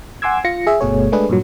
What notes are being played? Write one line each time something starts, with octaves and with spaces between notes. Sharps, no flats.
F#5 G#5 C6 D6 E6 G#6
F4 A#6 C#7
G#4 E5
G1 B2 A3 G#4 C#5
G#3 A3 D4 G#4 B4
G2 A#2 F#3